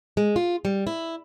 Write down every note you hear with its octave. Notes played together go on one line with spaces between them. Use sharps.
G#3
F4
G3
E4